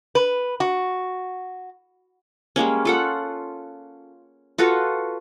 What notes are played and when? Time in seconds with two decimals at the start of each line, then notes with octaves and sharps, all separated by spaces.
0.15 B4
0.60 F#4
2.56 G3 G#3 A#3 C#4
2.85 F4 A4 F#5
4.58 F4 F#4 A4 B4